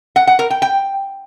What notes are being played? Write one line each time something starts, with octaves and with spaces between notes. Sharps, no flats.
F#5
F#5
A#4
G5
G5